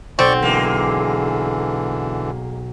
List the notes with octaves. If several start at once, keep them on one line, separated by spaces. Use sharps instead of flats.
B1 C4 D5 C#6
D3 E3 G#3 A#3